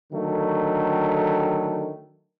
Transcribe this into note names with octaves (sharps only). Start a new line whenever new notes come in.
D3 D#3 F#3 A3